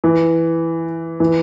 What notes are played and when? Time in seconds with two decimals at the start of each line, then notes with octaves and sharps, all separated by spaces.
0.04 E3
1.20 E3